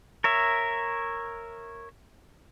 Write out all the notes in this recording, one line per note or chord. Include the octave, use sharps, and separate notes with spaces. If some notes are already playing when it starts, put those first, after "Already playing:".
A#4 C#5 E5